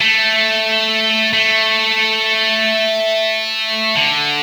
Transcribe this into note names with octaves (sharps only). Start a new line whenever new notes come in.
A3
A3
D3